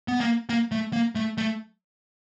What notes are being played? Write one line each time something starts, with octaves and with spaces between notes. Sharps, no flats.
B3
A#3
A#3
A3
A#3
A3
A3